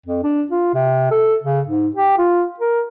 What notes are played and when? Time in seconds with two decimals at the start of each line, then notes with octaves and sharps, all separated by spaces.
0.06 F2
0.23 D4
0.51 F4
0.74 C3
1.11 A4
1.44 C#3
1.68 G#2
1.95 G4
2.18 F4
2.60 A#4